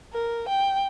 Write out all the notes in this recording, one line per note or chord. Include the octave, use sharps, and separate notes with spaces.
A#4
G5